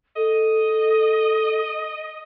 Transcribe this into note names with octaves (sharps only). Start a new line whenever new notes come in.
A4 D#5